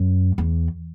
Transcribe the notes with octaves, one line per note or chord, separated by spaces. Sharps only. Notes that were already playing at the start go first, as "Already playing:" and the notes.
Already playing: F#2
E2